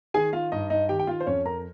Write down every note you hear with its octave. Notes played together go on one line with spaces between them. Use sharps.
D#3 G#4 G#5
F4 F5
G2 D#4 D#5
D#4 D#5
D#3 G4 G5
G5
F4 F5
C5
F2 C#4 C#5
A#4 A#5